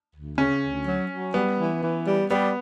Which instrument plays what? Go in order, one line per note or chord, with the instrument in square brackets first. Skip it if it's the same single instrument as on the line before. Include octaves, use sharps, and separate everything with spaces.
[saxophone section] D2
[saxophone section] C#3 [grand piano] C#4
[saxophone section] D2
F#3
F#3
[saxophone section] G3 [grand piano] B3
[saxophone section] E3
E3
G3
[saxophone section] G3 [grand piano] B3